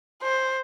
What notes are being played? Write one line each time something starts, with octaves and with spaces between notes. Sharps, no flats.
C5